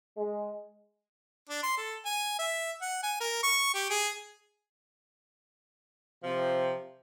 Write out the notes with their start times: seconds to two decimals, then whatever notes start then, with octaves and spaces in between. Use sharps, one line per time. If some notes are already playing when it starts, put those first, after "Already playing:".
0.17 G#3
1.49 D4
1.63 C6
1.78 A4
2.05 G#5
2.39 E5
2.81 F#5
3.03 G#5
3.20 A#4
3.43 C#6
3.74 G4
3.90 G#4
6.24 C3 F3